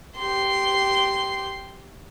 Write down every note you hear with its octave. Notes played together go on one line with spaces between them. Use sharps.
G4 C6